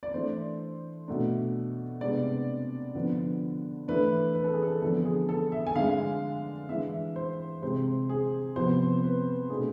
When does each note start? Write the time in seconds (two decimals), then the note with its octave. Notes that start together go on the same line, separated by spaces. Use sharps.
0.03 D5
0.14 E3 A3 D4 C5
1.08 B2 A3 D4
2.01 C3 G#3 B3 D4 D5
2.95 D3 F3 B3 D4
3.88 E3 A3 D4 B4
4.35 B4
4.44 A4
4.54 G#4
4.62 A4
4.82 D3 F3 B3 D4 A4
5.05 G#4
5.29 A4
5.52 E5
5.67 G#5
5.76 D3 G#3 D4 F5
6.69 E3 G#3 D4 E5
7.16 C5
7.62 C3 G#3 C4 C5
8.09 G#4
8.56 C3 F3 B3 C5
9.03 B4
9.50 B2 A3 D4 G#4